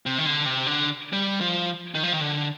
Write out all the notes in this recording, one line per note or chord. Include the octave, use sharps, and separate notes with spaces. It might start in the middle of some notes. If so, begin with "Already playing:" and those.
C3
D#3
D3
C3
D3
G3
F3
D#3
F3
D#3
D3